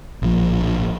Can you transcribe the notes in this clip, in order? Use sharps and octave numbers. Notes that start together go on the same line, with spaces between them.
A#1 A2 F3